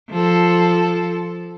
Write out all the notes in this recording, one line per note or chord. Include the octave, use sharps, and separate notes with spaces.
F3 A4